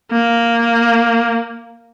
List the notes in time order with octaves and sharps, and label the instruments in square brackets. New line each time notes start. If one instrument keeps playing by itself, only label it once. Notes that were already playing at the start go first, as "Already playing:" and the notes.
[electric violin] A#3